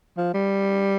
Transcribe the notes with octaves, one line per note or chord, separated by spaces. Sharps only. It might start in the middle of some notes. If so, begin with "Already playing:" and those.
F3
G3